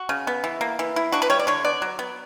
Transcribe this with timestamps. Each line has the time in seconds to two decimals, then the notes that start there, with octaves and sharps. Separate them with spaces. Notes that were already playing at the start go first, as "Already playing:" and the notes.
Already playing: F#4
0.09 C#3
0.27 B3
0.44 E3
0.61 A#3
0.79 E3
0.96 E4
1.12 D4 F#4
1.22 B4
1.30 G3 C#5
1.39 D5
1.47 D3 C#5
1.64 B3 D5
1.82 F#3
1.99 B3